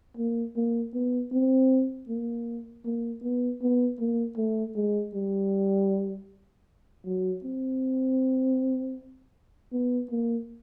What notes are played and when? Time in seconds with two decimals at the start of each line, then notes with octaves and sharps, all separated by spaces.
0.17 A#3
0.56 A#3
0.94 B3
1.32 C4
2.08 A#3
2.85 A#3
3.23 B3
3.62 B3
3.99 A#3
4.37 A3
4.76 G#3
5.14 G3
7.05 F#3
7.44 C4
9.72 B3
10.11 A#3